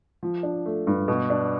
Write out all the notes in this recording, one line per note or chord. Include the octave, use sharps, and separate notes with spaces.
F3
D4
A3
G2
B2
D4